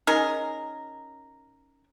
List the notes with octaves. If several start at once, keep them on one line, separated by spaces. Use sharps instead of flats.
C#4 D#4 G#4 A#4